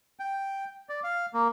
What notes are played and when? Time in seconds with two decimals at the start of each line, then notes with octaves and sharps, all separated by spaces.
0.19 G5
0.89 D5
1.04 F5
1.34 A#3